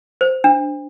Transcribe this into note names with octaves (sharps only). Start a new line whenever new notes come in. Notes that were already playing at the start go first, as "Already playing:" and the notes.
C5
D4